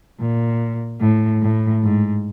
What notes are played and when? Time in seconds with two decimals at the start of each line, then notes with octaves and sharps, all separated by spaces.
0.19 A#2
1.00 A2
1.41 A2
1.82 G#2